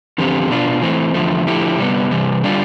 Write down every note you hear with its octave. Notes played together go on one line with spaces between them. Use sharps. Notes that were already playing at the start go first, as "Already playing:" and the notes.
E2 D3 F3 C4 G4
B2 B3 D4 F4
E3 A3 C4
E2 D3 F3 A3
D3 F3 A3 E4 G4
C3 G3 B3
C3 E3 G3
D3 G3 D4 F4